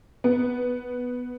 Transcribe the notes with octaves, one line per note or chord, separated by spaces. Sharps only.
B3